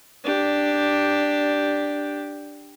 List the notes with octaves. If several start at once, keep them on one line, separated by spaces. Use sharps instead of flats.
D4 G4